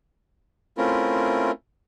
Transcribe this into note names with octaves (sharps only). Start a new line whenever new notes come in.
A3 C4 C#4 E4 F4 A#4